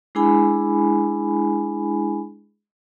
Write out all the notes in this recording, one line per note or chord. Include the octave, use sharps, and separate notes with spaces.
G#3 D4 E4 G#4 G#5 B5